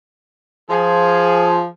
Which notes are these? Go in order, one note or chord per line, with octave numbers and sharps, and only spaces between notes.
F3 G#4